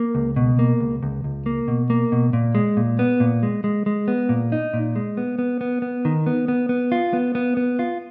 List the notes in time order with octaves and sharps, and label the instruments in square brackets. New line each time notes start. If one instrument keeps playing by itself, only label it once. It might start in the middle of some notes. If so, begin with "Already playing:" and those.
Already playing: [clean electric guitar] A#3
C#2
B2
A#3
C#2
C#2
C#2
A#3
B2
A#3
B2
A#2
G#3
A#2
B3
A#2
G#3
G#3
G#3
B3
A#2
D#4
A#2
G#3
B3
B3
B3
B3
D#3
B3
B3
B3
F4
B3
B3
B3
F4